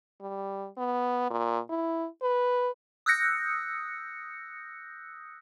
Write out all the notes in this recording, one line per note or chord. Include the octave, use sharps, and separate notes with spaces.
G3
B3
A#2
E4
B4
D#6 E6 F#6 G6 A#6 C#7